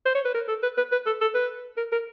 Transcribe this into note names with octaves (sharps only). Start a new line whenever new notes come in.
C5
C#5
B4
A#4
A4
B4
B4
B4
A4
A4
B4
A#4
A#4